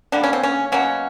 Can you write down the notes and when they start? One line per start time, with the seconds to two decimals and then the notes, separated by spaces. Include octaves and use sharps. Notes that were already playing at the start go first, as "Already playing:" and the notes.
0.12 D3 G3 A#3 D4
0.24 C#4
0.33 C4
0.43 C#4
0.72 B2 F#3 A#3 C#4